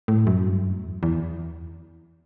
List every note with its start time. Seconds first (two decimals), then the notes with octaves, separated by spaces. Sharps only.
0.08 A2
0.27 F#2
0.46 G2
0.66 F#2
0.84 E2
1.03 E2